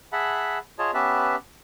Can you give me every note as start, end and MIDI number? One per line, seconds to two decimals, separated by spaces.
0.12 0.58 68
0.12 0.58 76
0.12 0.58 78
0.12 0.58 81
0.12 0.58 83
0.79 0.91 65
0.79 0.91 68
0.79 0.91 73
0.79 0.91 75
0.79 0.91 81
0.94 1.36 59
0.94 1.36 61
0.94 1.36 67
0.94 1.36 71
0.94 1.36 76
0.94 1.36 81